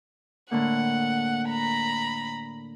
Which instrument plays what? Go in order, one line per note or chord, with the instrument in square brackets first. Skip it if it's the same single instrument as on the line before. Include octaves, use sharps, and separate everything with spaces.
[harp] A2 D3 A#3 [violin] F#5
[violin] A#5 B5